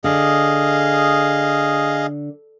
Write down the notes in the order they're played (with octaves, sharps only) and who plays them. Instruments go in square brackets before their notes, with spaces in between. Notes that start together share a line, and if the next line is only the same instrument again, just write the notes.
[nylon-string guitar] D3 [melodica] G#4 D#5 F5